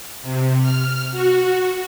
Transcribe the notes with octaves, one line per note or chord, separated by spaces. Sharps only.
C3
F6
F#4